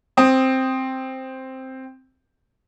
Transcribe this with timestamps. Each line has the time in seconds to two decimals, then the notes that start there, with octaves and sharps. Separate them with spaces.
0.17 C4 D#6